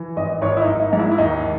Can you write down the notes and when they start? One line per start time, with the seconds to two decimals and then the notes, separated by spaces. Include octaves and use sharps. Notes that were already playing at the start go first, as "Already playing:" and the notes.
Already playing: E3
0.17 G#1 D#5
0.42 G#1 C#5
0.57 E4
0.61 D#4
0.67 G#1
0.80 D#4
0.93 G#2
0.99 E4
1.11 E4
1.18 D#2 D#4
1.43 D#3